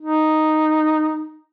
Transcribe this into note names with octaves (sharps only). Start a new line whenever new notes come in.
D#4